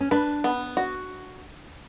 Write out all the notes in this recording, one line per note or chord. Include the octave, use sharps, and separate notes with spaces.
C#4
D4 B4
B3
F#4